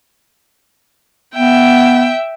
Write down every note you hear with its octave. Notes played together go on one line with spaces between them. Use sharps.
B3 E5 G5